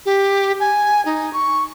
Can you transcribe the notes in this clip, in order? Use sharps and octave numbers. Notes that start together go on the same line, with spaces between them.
G4
G#5
D#4
C#6